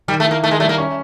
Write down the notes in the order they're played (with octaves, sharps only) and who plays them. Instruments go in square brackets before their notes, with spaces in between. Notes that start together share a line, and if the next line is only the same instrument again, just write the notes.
[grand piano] D#3 [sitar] G3
[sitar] A3
[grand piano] E4
[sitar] A#3
[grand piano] D#3 [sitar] A3
[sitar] G#3
[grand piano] G3 [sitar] A3
[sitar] A#3
[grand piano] C#4